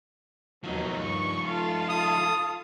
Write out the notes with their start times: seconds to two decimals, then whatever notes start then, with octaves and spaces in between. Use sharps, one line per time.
0.64 D#2 B2 F3 F#3 D#4
1.02 G2 C#6
1.45 F4 A4 F5
1.89 D#6